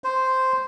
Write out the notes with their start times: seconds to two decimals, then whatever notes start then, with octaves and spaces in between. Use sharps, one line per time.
0.04 C5